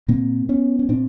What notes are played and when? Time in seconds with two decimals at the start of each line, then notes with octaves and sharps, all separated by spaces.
0.08 A#2 A#3 C4
0.49 B3 C#4
0.79 C#4
0.89 A#2 C4 D4